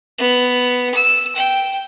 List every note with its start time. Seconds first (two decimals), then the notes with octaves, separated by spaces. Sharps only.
0.19 B3
0.94 E6
1.36 G5